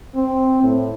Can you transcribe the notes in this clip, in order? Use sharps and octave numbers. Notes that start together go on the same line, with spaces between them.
C4
A2